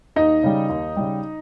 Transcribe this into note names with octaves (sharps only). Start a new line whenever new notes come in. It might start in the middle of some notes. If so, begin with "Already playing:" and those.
D#2 D#4 D#5
C#3 G3
D#2
C#3 G3